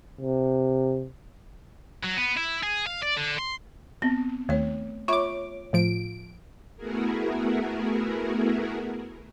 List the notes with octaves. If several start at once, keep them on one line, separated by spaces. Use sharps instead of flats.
C3
F#3
B3
E4
G#4
F5
D5
D3
C6
B3 C4
D#2 A3 C#5
F4 C#5 E5 B5 D6
A2 F3 D7
A3 B3 E4 F#4 G#4 A#4